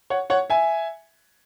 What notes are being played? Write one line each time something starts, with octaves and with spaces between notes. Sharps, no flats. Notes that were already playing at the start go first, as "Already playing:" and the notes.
C#5 F#5
C#5 F#5
E5 G#5